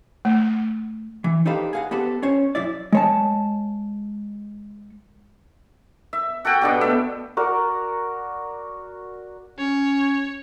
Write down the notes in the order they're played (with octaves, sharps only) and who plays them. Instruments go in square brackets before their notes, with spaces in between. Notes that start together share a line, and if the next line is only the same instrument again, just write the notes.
[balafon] A3
[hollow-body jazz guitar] E3
D#4 G4 A4 B4 C5 F5
G#4 F5 F#5
B3 G4 A4 B4 C5
C#4 C5 C#5
F#2 E4 D5
G#3 C#5 A5
[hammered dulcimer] E5
F#4 A4 F#5 G5
B2 D3 G4
A3 E5
[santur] F#4 A#4 D5
[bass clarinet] C#4 [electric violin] C#5